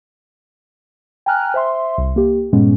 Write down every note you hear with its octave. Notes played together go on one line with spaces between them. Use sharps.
G5 G#5 A#5 F6 F#6
C5 E5 C6
C2
A#3 G4
G2 A#2 G#3 B3 C#4